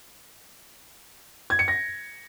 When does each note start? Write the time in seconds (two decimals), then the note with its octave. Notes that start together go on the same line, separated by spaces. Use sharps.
1.50 G#6
1.59 C#7
1.68 A#6